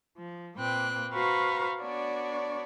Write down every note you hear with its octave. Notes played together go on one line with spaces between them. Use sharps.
F3
A#2 A#3 C4 B4 G5 F#6
F#4 B4 C5 F5 A#5 C#6
B3 D4 F#4 C#5 D5